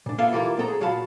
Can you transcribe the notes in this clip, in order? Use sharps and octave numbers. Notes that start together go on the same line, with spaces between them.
A#2 D4
A#3 B3 F4 A4 E5 F5
E3 G3 E4 F4 A#4
B1 B3 C4 A4 A#5
G#4
A#2 F#3 F4 F5 A5 B5